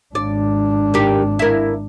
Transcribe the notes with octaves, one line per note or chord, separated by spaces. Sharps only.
G#1 D4 D5
D#3 G4
E4 A#4